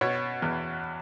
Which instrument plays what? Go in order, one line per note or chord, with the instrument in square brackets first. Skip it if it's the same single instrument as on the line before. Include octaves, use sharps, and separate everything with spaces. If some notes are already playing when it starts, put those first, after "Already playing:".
[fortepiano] B2 C#5
E2